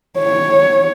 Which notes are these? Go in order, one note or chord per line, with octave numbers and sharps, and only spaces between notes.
C#5